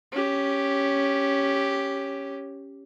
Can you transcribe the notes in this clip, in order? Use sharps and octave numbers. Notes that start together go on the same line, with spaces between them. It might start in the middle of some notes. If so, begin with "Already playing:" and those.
C#4 G4